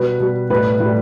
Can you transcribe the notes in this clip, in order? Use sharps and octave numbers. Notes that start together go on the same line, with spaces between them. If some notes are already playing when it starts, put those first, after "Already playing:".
Already playing: B2 G3 B4
B2 G3
A2 G3 B4
A2 G3